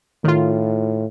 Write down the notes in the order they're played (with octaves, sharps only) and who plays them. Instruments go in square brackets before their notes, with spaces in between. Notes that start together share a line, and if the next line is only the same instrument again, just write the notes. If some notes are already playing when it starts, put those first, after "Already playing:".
[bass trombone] A2 [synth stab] D#3 F4